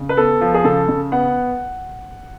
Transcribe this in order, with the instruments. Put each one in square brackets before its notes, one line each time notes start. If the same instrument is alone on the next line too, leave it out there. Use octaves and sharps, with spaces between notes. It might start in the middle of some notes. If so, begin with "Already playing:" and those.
Already playing: [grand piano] C#3
B4
B3 A4
F3
G#4
C#3 A4
C#3
B3 F#5